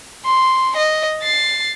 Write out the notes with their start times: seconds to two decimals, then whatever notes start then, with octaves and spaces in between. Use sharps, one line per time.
0.25 C6
0.77 D#5
1.22 A6 C7